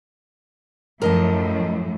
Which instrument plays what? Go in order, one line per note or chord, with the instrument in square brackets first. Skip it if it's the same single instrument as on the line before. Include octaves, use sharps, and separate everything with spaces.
[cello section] F#2 A2 F3 [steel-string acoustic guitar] A#4 D#5 A5